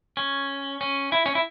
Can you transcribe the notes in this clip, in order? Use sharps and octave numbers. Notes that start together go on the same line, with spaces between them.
C#4
C#4
E4
C#4
E4